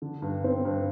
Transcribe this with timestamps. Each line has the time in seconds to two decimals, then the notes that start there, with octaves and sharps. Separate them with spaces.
0.02 D3
0.22 G2
0.44 C4
0.65 G2